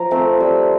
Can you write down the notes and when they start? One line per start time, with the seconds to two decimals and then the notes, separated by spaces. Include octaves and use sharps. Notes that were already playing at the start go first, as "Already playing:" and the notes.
Already playing: F3 A#5
0.11 A3 C4
0.40 G3